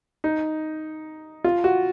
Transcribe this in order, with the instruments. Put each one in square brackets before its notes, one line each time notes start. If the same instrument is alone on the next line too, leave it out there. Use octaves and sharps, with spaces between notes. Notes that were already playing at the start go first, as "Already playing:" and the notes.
[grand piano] D#4
F4
F#4